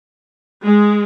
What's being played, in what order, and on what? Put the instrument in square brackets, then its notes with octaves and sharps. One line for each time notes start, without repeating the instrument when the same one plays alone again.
[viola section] G#3